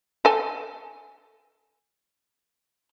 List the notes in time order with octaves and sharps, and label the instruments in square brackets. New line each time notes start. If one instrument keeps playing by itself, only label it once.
[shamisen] A4 G#5